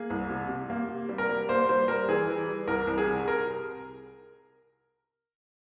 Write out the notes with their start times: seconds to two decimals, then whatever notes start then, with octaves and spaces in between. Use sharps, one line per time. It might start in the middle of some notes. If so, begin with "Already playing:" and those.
Already playing: A#3 G#4
0.10 C2
0.30 C3
0.49 C3
0.70 A#3
0.89 C3
1.09 G3
1.18 A#4
1.29 G3
1.49 A#3 C5
1.69 G3 C5
1.88 G3 A#4
2.08 E3 G#4
2.28 E3
2.48 G3
2.68 C2 A#4
2.87 C2
2.98 G#4
3.07 C3
3.28 A#4